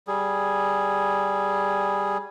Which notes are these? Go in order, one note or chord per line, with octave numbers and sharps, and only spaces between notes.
G3 G#4